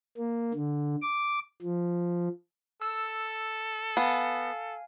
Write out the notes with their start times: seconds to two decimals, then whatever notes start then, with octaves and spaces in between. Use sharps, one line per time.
0.18 A#3
0.54 D3
1.02 D6
1.62 F3
2.82 A4 E6
3.97 B3 F5 G#5